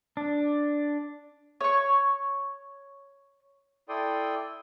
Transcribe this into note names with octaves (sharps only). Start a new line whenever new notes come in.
D4
C#5 C#6
E4 A4 D5 G5 C6 D#6